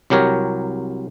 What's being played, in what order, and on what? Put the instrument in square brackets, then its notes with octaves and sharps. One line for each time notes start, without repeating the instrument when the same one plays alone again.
[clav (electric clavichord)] C2 F#3 G4 A#4 C#5